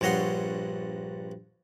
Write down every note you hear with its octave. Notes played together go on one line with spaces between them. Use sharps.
A#1 G2 C#5 D#5 F#5 C6